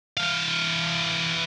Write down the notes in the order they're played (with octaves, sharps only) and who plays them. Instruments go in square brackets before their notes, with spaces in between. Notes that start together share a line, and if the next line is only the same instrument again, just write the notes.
[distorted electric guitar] E3 F5